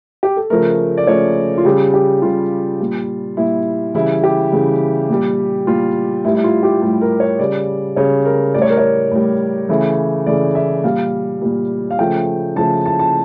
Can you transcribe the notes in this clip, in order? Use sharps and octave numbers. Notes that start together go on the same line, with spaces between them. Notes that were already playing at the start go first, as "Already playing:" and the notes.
G4
A4
C#3 F3 A3 A#4
D5
C#3 F3 A3 C#5
F4
C#3 G3 G4
G4
C#3 G3 F4
A#2 G3
A#2 G3 E4
C#3 E3 G3 E4
G4
C#3 E3 G3
A#2 G3
A#2 G3 F4
A2 G3 E4
E4
F4
G4
A2 G3
A#4
C#5
C#3 G3 D5
C#3 G3 C#5
A#4
A2 G3 D5
C#5
A#4
C#5
A2 G3
C#3 E3 A3
C#3 E3 A3 D5
E5
A#2 G3 F5
A#2 G3
F5
C#3 F3 A3 G5
C#3 F3 A3 A5
A5
A5